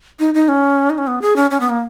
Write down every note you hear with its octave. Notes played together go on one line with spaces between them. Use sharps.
D#4
D#4
C#4
D#4
C#4
B3
G#4
C#4
C#4
B3
A#3